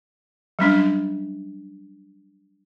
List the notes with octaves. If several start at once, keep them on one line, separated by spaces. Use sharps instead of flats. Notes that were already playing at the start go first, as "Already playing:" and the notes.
F#3 G3 C#4 D4